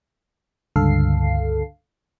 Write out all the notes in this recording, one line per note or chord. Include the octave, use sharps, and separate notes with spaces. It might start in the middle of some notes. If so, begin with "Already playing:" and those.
C#2 G2 D3 A4 F5 C7